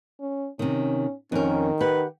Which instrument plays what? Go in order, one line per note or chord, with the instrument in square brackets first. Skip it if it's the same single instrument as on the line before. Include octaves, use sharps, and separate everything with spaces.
[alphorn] C#4
[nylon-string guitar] C3 D#3 [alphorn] C#4
[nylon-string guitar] F2 A#4 [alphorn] D#3 [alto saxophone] C#4
[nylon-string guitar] G4 F#5 [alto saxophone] B4